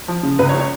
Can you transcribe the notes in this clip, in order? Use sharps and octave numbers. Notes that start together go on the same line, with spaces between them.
F3
C#3
C#2 B4
C#5
C#3
C#5